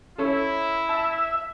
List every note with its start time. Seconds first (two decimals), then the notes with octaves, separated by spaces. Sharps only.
0.18 C#4 E4 A4
0.89 E5 A5